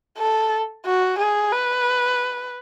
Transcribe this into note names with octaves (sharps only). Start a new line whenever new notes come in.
A4
F#4
G#4
B4